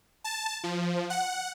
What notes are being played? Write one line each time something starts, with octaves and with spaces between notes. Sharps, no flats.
A5
F3
F#5